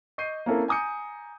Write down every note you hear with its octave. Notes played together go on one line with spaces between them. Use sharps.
D#5 C#6 G6 C7 D#7
A#3 C4 C#4 E4 A4 A#4
G#5 A#5 D#6 G6 C#7